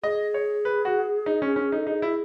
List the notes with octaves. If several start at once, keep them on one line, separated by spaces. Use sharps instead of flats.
G#4 D#5
C#5
B4
F#4
D#4
C#4
C#4
D#4 A4
D#4 G#4
E4